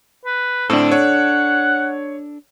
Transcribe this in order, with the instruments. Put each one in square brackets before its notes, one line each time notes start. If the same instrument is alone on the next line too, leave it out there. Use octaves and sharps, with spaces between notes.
[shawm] B4
[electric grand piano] A2 C4 [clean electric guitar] D4 A4
[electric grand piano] C#5 [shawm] F#5